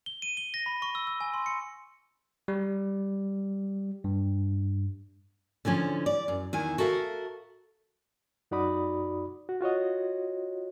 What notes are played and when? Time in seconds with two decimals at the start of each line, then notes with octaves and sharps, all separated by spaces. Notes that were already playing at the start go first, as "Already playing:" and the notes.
0.06 G7
0.22 D#7
0.37 G7
0.54 A#6
0.66 B5
0.82 C#6
0.95 E6
1.07 E6
1.21 G#5
1.34 C6
1.46 C#7
2.48 G3
4.04 G2
5.65 D3 E3 F3 C#4
6.06 D5
6.28 F#2
6.53 E2 D#3 E4 G#5
6.78 F#4 A4 A#4 E5 F5
8.51 F#2 D#4 F#4 D5 B5 D#6
9.49 F#4
9.61 F4 F#4 C#5 D#5